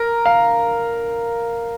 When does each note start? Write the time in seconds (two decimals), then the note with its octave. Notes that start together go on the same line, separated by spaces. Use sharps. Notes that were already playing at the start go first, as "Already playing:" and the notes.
Already playing: A#4
0.26 F5